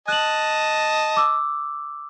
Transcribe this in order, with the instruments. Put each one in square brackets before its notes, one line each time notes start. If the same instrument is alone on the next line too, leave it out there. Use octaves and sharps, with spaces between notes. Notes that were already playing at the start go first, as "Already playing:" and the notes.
[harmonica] D#5 A5 [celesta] F#6 F#7
[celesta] D6 E6